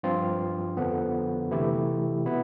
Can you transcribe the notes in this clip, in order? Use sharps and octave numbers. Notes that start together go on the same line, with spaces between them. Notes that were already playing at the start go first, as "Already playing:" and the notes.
G2 F3 C4 F4
F2 D3 F3 B3
C3 E3 A3 E4 G4
B2 B3 E4